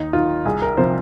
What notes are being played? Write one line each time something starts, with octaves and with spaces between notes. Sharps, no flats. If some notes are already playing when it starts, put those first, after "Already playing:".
Already playing: D#2 D#4
D#3 F4
C2 G#4
A#4
C3 F3 C5